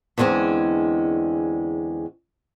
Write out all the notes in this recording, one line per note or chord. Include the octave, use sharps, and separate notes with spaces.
E2 D3 G#3 C4 C#4